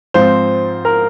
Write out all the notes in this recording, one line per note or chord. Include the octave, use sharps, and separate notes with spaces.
G#2 F3 C4 F4 C5
A#4